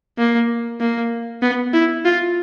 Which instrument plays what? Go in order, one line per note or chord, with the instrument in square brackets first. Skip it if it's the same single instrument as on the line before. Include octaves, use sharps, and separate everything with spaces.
[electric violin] A#3
A#3
B3
E4
F4